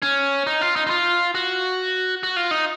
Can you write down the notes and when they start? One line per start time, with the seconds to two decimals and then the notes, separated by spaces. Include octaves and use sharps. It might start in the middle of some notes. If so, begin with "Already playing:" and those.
0.02 C#4
0.47 D#4
0.61 F4
0.76 D#4
0.87 D#4
0.90 F4
1.35 F#4
2.23 F#4
2.36 F4
2.51 D#4